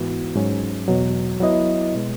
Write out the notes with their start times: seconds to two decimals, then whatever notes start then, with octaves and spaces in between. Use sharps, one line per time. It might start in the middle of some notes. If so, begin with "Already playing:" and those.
Already playing: G#2 E3 B3 F#4
0.35 G#2 F#3 C#4
0.88 E2 B2 F#3
1.40 F#3 B3 E4 B4 D#5
1.94 B2 G#3